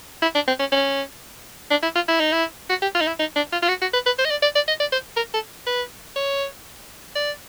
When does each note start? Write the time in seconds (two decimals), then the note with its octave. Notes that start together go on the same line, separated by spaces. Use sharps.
0.22 E4
0.35 D4
0.48 C4
0.60 C#4
0.72 C#4
1.71 D4
1.83 E4
1.95 F4
2.08 E4
2.20 D#4
2.33 E4
2.70 F#4
2.82 G4
2.95 F4
3.01 D#4
3.07 E4
3.19 D#4
3.36 D4
3.52 F4
3.63 F4
3.69 F#4
3.82 F#4
3.94 B4
4.06 B4
4.19 C5
4.25 D#5
4.31 D5
4.43 D5
4.56 D5
4.68 D#5
4.80 D5
4.92 C5
5.17 A#4
5.34 A4
5.67 B4
6.16 C#5
7.15 D5